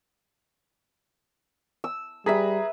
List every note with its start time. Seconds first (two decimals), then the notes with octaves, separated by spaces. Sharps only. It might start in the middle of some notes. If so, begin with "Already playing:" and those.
1.84 E6
2.26 G3 G#4 B4 E5 A#5 B6